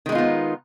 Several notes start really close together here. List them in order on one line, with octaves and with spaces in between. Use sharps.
D#3 G#3 D#4 F4 B3